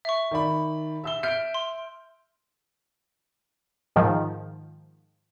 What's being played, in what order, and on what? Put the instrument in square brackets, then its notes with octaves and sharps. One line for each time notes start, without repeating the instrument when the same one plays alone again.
[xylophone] E5 C#6
[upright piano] D#3 D5 B5
E5 E6 G7
[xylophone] E5 [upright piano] F6 G6 D7
[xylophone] C6
[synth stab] G#2 D#3 F3